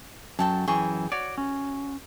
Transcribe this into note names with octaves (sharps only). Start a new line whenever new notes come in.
F#2 F#3 A4 G5 A5
F#2 E3 G#4 G5 C#6
F#4 C#5 D5
C#4